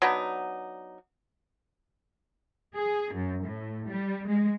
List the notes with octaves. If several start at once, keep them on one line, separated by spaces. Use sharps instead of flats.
F#3 B3 D4 D#4
G#4
F#2
A2
G3
G#3